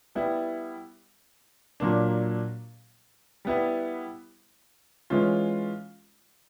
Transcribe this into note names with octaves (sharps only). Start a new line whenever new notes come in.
G3 B3 E4
A#2 F#3 A#3 D4
G3 B3 E4
E3 G#3 C#4 F4